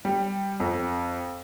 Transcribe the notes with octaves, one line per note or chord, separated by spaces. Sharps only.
G3
F2